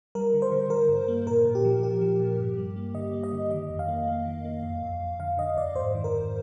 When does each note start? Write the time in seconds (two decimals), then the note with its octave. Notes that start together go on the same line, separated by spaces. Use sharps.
0.15 G3 A#4
0.34 D3
0.42 C5
0.52 D3
0.70 D3 A#4
0.89 G2
1.08 A#3
1.27 A#2 A#4
1.45 A#2
1.55 G4
1.65 F3
1.83 A#2 G4
2.01 F3
2.20 A#2
2.39 G2
2.57 G3
2.76 A#3
2.94 D3 D#5
3.13 A#3
3.23 D#5
3.32 D3
3.51 D#3 D#5
3.70 F2
3.79 F5
3.88 A#3
4.07 A#3
4.25 D#3
4.45 A#3
4.63 F2
4.83 F2
5.00 F2
5.20 D3 F5
5.38 D3 D#5
5.57 F2 D5
5.75 G#2 C5
5.95 D#3
6.04 A#4
6.13 G#2